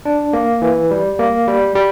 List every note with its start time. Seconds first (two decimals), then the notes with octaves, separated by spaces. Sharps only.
0.05 D4
0.33 A#3
0.62 E3
0.91 G3
1.19 A#3
1.47 G3
1.75 G3